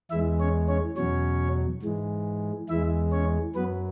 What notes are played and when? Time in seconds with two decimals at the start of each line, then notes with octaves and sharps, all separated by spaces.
0.11 E2 E3 G#3 E4 E5
0.40 C#4 C#5
0.68 C#4 C#5
0.97 E2 B2 F#3 C#4 C#5
1.83 G#2 E3 G#3
2.69 E2 E3 G#3 E4 E5
3.12 C#4 C#5
3.56 F#2 F#3 B3 B4